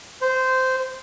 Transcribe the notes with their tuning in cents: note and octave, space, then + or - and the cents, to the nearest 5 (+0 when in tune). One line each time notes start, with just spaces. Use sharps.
C5 -15